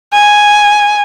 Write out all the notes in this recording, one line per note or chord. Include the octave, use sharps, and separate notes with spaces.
G#5